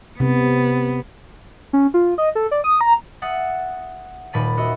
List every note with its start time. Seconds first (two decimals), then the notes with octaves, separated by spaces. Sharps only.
0.20 C3 B3
1.73 C#4
1.94 F4
2.18 D#5
2.35 A4
2.51 D5
2.64 D#6
2.81 A#5
3.22 E5 F#5 D#6 A6
4.33 D#1 A#2 B5 A6 D#7
4.57 F#4 D#5 E5